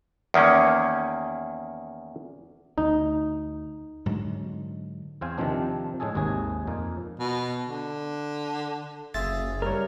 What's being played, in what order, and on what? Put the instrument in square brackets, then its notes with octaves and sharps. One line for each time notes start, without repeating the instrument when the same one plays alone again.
[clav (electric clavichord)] E2 D#3 A#3 C#4
[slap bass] D2 [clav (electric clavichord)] D#4
[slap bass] G#2 D3 F#3
[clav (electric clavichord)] E2 C4 C5 F5 G#5
C3 D#3 F3 C4 D4
A2 G#3 C#4 G#4 A4
G#1 D#2 G#2 C3 G#4
F2 A#2 A#3 D#4
[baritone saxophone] B2
D3
[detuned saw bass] F#1 [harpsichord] F4 G#4 E5 [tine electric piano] A6
[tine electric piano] G3 C#5 [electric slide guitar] A#4